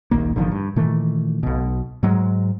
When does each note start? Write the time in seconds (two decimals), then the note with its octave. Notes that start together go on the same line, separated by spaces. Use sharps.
0.11 D#1 A#1 D#3 A#3
0.36 G1 D3 D#3 F3
0.52 G2
0.76 A#2 D#3 E3 A3
1.43 B1 B2
2.03 G#2 F#3 G#3